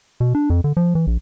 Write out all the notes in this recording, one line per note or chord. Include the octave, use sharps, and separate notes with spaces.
B2
D4
F2
D3
F3
E3
A#1